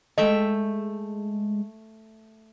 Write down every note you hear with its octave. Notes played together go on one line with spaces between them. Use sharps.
G#3 A3 D#5 E5 G5